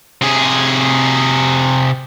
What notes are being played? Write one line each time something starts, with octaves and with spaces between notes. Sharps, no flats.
C3 G#4